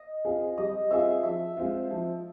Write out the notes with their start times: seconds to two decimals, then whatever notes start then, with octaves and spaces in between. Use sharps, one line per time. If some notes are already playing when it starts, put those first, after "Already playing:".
Already playing: D#5
0.25 C4 F4 G#4
0.58 G3 D#5
0.90 C4 F4 G#4 E5
1.23 F3 E5
1.57 G#3 C4 F4
1.91 F3